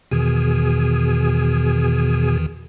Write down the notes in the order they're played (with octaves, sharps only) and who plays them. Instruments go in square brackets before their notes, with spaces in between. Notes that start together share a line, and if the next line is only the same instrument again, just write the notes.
[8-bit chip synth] E2 D#3 E3 [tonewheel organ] B2 G#4